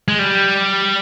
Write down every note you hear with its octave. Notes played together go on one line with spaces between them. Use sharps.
G#3
G3